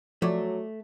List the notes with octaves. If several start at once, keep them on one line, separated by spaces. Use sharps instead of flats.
F3 F#3 A3 C#5 D5